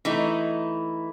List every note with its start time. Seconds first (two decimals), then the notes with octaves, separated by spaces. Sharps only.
0.05 E3 A3 D#4